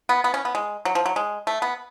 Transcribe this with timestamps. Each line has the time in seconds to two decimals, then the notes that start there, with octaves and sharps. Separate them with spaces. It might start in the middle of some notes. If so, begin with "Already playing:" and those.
0.09 B3
0.24 B3
0.34 C#4
0.45 B3
0.55 G#3
0.85 F#3
0.95 F3
1.06 F#3
1.16 G#3
1.47 A3
1.62 B3